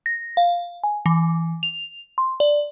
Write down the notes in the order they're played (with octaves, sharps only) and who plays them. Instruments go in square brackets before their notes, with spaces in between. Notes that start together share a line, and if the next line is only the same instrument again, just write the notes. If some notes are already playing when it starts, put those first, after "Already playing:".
[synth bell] A#6
F5
G#5
E3
F7
C6
D5